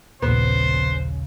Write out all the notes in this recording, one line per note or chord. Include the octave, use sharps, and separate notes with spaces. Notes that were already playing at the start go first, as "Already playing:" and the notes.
D#1 A#1 C#3 B3 C5